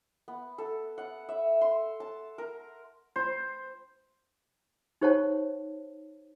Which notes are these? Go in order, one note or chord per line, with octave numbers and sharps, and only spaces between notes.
B3
A4
F#5
E5
C6
A5
A#4
C5
D#4 G4 C5 C#5 F#5 A5